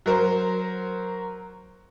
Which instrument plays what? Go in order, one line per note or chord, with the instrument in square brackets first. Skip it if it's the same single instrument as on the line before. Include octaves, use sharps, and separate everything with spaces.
[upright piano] F#3 A#4 C5